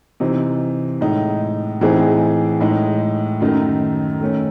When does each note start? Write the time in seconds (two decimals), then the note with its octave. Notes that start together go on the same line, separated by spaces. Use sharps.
0.20 C3 E3 C4 D#4
1.01 A2 G#3 D#4
1.81 A2 E3 C4 D#4 G#4
2.60 A2 G#3 D#4
3.40 F#2 D#3 A3 D#4
4.21 D#3 A3 C#4